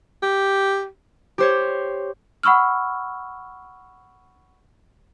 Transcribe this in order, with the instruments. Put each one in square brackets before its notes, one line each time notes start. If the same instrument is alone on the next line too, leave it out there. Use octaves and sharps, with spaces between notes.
[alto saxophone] G4
[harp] G4 C5 C#5
[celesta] F#5 B5 C#6 E6 F6